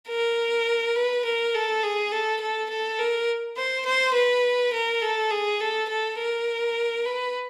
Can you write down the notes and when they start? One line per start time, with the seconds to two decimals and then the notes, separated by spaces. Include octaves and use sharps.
0.08 A#4
0.96 B4
1.25 A#4
1.54 A4
1.83 G#4
2.12 A4
2.40 A4
2.70 A4
2.98 A#4
3.56 C5
3.86 C5
4.14 B4
4.73 A#4
5.02 A4
5.30 G#4
5.60 A4
5.89 A4
6.18 A#4
7.05 B4